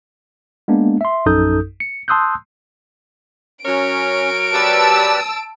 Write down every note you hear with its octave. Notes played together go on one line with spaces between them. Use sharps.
G#3 A#3 B3 D4
E5 C6
A#1 F#2 D#4 A4 D#6 G6
C#7
A5 C6 D#6 E6 F#6 G6
F#3 C#4 A#4 C#5 D7
G4 B4 D5 A5 E6